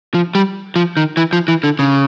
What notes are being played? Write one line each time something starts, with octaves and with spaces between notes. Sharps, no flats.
F3
G3
F3
D#3
E3
F3
E3
D3
C#3